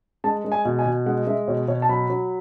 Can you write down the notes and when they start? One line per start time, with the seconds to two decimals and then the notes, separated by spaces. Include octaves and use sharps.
0.24 G#3 A5
0.45 G#3
0.52 G#5
0.65 B2
0.79 G#5
0.86 B2
1.06 G#3 F#5
1.27 G#3 E5
1.48 B2 C#5
1.68 B2 C#5
1.82 A5
1.89 F#3 B5
2.10 F#3